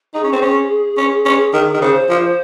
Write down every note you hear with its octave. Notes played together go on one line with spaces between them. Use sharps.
D#4 G#4
C#4
C4
C#4
C#4
C#4
D#3
D#3
C#3 C5
F3